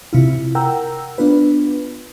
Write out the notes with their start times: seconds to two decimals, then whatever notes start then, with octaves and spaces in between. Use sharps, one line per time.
0.13 C3 E4 F4
0.55 A#4 F#5 G5 A#5 E6
1.18 B3 D4 F4 B4